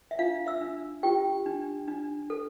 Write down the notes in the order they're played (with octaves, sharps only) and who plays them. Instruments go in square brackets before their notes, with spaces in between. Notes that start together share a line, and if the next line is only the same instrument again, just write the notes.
[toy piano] E5
D4 F4 F5
E5 E6
D4
F4 G4 G5
D4
D4
A4